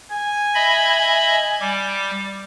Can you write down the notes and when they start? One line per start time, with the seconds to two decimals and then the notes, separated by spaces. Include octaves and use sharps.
0.11 G#5
0.54 D#5 E5 B5
1.60 G3 D6